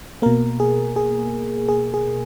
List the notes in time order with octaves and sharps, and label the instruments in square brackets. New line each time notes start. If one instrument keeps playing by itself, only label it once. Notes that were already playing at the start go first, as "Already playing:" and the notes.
[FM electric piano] B2 A#3 A#4
G#4
G#4
G#4
G#4